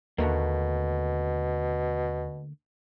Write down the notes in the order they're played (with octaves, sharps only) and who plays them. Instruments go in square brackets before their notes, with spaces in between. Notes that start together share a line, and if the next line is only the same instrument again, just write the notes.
[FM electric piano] D#2 [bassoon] B2 [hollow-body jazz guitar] D3 A3 A#3